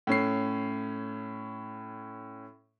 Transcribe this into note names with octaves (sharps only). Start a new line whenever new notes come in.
A2 C#4 C7